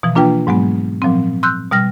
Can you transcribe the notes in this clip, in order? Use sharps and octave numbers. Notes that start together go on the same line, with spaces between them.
B2 E3 F3
A#3 D4 F4 B4 G5
G#2 F#3 G#3 B3
A#2 F3 F#3 C4
C6 E6 F#6 G6
B2 G3 F6 A#6